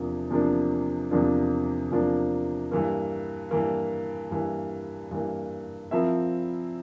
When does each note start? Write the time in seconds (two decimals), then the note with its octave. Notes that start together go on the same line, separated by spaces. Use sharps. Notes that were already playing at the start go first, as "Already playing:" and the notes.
Already playing: E2 C3 F3 A#3 D4
0.30 E2 C3 F3 A#3 D4
1.11 E2 C3 F3 A#3 D4
1.91 E2 C3 F3 A#3 D4
2.72 G2 E3 A#3
3.51 G2 E3 A#3
4.31 G2 E3 A#3
5.11 G2 E3 A#3
5.91 F3 C4 E4 A#4 E5